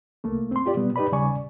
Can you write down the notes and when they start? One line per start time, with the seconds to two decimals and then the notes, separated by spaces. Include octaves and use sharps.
0.24 C2 A3 A#3
0.51 C4 C6
0.66 F4 G4 D5
0.77 B2 G3 B3
0.96 D#4 G4 B4 D5 B5
1.12 D#2 C#3 G3 D5 G#5 C#6